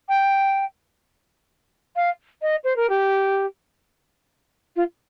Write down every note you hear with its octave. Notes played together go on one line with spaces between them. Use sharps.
G5
F5
D#5
C5
A#4
G4
F4